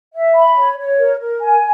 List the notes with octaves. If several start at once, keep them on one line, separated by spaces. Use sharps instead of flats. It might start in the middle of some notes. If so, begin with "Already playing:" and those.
E5
B5
C#5
C#5
A#4
A#4
G#5